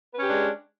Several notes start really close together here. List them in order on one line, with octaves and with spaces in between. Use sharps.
B4 C#4 G4 D4 G#3